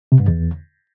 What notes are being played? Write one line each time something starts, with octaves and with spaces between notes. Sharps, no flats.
C3
G2
E2